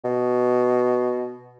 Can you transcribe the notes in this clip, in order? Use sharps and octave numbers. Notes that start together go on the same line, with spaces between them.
B2